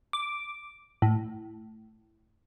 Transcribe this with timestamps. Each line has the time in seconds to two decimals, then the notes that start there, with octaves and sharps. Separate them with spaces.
0.13 D6
1.02 A2